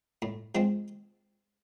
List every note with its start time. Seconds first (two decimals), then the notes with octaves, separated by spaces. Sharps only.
0.22 A2
0.55 F3 G#3 C4